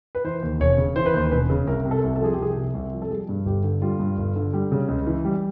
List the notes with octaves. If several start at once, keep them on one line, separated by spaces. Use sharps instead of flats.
B4
E3 C5
D#2
E1 C#5
C#3
E3 C5
B4
D#2 C5
E1 B4
C#3
C2 A#4
C3
A4
C2
A4
F3 G#4
G4
C2 G#4
C3
C2
F3
A4
G3 G#4
G2
G1 G4
D3
G3 F4
G2
G1
D3
G3
C#3
C#2
E3
G3